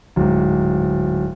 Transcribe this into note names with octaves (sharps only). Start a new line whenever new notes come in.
D1 G#2